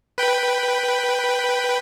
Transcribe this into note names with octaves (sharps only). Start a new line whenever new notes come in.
B4 G5 B5